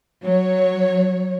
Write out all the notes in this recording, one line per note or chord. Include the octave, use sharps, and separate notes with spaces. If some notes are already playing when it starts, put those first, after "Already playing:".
F#3 C#5